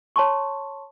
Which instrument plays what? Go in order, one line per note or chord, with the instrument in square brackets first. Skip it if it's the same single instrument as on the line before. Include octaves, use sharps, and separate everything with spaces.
[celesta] C#5 A5 C6 C#6